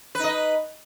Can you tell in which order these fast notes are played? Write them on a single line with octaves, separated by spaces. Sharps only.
B4 D#4 D#5